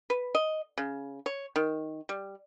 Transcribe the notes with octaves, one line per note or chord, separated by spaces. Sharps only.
B4
D#5
C#3
C#5
D#3
G3